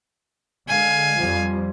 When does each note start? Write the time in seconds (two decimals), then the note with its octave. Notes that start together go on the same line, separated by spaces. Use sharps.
0.68 D3 G#3 F5 G#5
1.17 F2 F3 G3